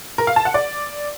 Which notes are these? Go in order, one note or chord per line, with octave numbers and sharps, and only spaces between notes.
A#4
F5
A5
F#5
D5